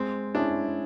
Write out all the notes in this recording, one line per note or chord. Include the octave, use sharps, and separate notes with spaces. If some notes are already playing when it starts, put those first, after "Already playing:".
Already playing: G#3 C4
C#4 D4 E4 G#4